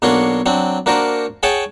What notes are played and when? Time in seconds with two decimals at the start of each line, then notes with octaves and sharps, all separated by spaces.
0.02 B1 A#3 D4 F#4 C#5 C6
0.46 F#3 C4 D4
0.86 A#3 D4 F#4 A#4 C5
1.43 G#4 C#5 F#5 G5 A5